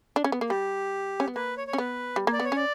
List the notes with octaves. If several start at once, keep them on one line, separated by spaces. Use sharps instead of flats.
D4
C#4
B3
A#3
G3 G4
C#4
B3
A#3 B4
C#5
C#5
C#4
B3 B4
G3
A#3
D5
B3 C#5
C#4 D5